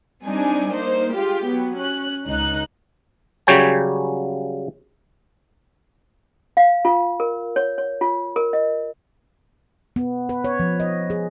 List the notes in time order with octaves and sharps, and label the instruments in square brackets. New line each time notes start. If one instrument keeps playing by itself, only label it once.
[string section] G3 C4 D4 D#4 G#5
A#3 D#4 C5
G#3 F4 G4
F#3 B3
C#4 F#6
C#2 D#4 F#6
[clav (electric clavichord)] C#3 F#3 G3 C#5 G5 G#5
[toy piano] F5
F4
A#4
C#5
C#5
F4
A#4
D#5
[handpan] B3
B4
C#5
F3
D#5
G#4